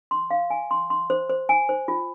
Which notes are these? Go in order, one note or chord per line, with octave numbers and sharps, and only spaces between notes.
C6
F5
G#5
C6
C6
C5
C5
G#5
C5
F4